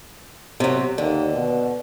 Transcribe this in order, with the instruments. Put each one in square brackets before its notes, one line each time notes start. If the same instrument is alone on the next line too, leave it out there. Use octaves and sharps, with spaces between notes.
[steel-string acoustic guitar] C3 F#3
[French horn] D#2 [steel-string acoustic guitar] D3
[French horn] B2